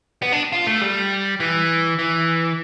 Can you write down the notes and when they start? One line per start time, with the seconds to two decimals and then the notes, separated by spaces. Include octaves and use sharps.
0.22 B3
0.33 D4
0.52 F4
0.67 A3
0.81 G3
1.40 E3
1.99 E3